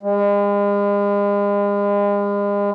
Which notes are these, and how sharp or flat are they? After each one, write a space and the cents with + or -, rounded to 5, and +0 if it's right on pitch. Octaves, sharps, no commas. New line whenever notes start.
G#3 -40